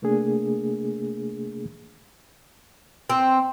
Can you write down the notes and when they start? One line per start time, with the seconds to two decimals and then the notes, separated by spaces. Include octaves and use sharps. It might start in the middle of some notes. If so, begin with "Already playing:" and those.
0.02 C3 A3 A#3 D4 G#4
3.10 C4